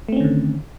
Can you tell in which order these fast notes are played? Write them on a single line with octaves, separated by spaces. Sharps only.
A3 C4 C#4 D#3 D3